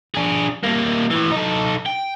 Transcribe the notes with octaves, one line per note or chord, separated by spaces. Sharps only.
D4 G#4
G3 A#3
A2 E3
D#4 A4
G5